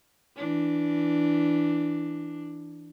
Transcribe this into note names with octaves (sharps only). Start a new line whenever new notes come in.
E3 D4